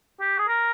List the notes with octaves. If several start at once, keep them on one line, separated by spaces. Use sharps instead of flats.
G4
G#4
A#4